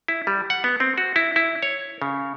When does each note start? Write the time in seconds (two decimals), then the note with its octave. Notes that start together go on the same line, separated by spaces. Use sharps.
0.08 E4
0.27 G3
0.50 F#5
0.64 B3
0.80 C4
0.98 F#4
1.16 E4
1.36 E4
1.63 C#5
2.02 C#3